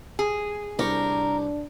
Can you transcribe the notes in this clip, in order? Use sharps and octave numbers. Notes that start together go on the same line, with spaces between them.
G#4
C2 D4 G4 A#4 C#6